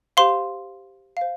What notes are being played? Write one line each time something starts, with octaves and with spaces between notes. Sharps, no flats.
G4 C5 F5 C6
C5 F5